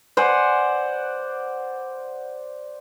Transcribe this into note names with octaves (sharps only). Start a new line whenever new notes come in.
C5 D5 F#5 G#5